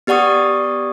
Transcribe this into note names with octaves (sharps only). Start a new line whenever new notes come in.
B3 G4 D5 F#5 C#6 D#6